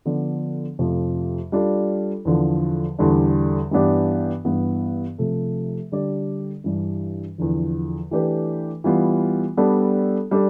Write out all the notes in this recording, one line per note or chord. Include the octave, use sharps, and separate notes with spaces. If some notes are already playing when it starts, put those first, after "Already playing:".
D3 F3 B3 D4
F2 C3 F3 A3
G3 D4 F4 A4
E2 D3 F3
E2 D3 G3 D4
G2 E3 B3 D4 G4
G2 E3 B3
C3 F3 A3
D3 G3 D4 G4 D5
G2 E3 G3 D4
E2 D3 F3
E3 A3 D4 G4 B4
E3 G3 B3 F4
G3 B3 D4 A4
G3 D4 A4